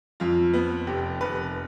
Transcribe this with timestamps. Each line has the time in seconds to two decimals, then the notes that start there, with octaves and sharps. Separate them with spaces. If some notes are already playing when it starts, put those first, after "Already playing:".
0.20 F2 F4
0.53 B3
0.87 F1 G4
1.21 F1 B4